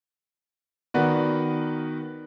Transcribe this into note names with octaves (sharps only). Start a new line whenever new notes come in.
D#3 B3 F#4 A#4 B4 D5